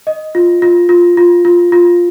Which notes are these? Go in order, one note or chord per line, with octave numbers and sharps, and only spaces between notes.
D#5
F4
F4
F4
F4
F4
F4